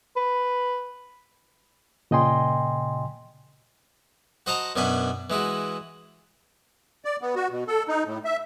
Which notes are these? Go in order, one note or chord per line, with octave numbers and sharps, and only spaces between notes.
B4
A#2 C#3 D#5 G5 G#5 C6
F#4 C5 D#5 F#5 A5 A#5
F#2 B2 D4 G#5 B5
E3 G#3 E4 F#4
D5
B3
F#4
B2
A4
D#4
A2
E5